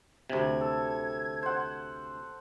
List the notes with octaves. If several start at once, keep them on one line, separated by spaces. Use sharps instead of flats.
D2 C3 G#6
A4
C5 F#5